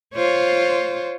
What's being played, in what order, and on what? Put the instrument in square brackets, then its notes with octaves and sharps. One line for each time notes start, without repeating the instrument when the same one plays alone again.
[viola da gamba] F4 C5 C#5